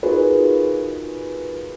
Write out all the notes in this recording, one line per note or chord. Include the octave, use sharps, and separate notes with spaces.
D#4 F4 F#4 G#4 A#4 B4